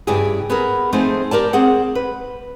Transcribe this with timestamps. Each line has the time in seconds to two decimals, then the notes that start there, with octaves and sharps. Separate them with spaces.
0.07 G2 C#3 E4 G4 G#4
0.50 B3 G#4 A#4
0.93 F3 A3 C4 D#4 G#4 C5
1.31 G4 A#4 D5 A5
1.53 C4 G#4 F#5
1.95 B4